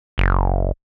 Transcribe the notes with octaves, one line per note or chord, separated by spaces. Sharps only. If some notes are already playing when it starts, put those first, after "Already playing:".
F#1